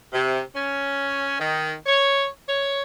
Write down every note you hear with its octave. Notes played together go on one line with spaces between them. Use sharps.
C3
C#4
D#3
C#5
C#5